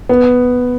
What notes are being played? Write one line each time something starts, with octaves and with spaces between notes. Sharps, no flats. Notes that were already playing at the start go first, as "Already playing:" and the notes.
B3